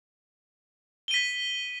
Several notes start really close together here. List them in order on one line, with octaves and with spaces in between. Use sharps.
G7 D#7 B6